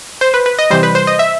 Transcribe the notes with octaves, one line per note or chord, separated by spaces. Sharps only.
C5
B4
B4
D#5
C3 E3 G3 C5
B4
C5
D#5
E5